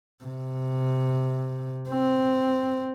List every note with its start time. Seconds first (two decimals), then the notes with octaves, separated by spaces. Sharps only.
0.24 C3
1.89 C4